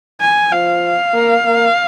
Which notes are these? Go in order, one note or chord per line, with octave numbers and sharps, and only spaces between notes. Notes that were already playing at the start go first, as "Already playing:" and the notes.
G#5
F3 F5
A#3
A#3